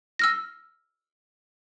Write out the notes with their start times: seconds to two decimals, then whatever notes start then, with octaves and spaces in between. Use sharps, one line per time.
0.19 E6 F6 A#6